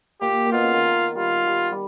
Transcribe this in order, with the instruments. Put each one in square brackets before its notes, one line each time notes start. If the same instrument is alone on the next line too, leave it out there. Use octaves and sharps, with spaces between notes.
[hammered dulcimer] A#2 [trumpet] G4
[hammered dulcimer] A#2
[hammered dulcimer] B2 [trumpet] F4
[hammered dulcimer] C#3
D#3
[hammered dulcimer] G3 [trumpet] F4
[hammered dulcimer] G3
G3